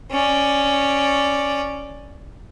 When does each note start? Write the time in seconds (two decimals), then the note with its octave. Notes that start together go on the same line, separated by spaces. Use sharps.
0.11 C#4 D5